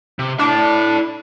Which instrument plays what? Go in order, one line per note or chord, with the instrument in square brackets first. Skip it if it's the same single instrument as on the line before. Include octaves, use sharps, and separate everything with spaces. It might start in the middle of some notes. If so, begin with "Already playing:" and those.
[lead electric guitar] C3
[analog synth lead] D4 [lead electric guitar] E4 A5